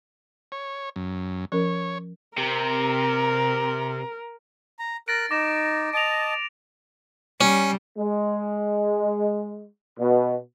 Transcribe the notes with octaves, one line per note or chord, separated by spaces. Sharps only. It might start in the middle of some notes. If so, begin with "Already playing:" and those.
C#5
F#2
F3 C#4 A#4 C#5
C3 A#4
A#5
A#4 F#6 A6 A#6 D7
D#4 D6 A#6 E7
D#5 A5 D7 F7
G3 C#4
G#3
B2